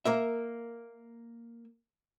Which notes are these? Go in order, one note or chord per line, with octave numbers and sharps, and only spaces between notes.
A#3 A#4 E5